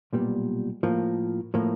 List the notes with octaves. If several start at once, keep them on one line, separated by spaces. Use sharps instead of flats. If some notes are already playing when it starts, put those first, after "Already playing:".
B1 A#2 G3 B3
A2 F3 A#3
A2 F3 A#3